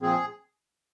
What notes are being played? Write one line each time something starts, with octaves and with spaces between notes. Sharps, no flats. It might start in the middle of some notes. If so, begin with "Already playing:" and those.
A#2 F3 C4 G#4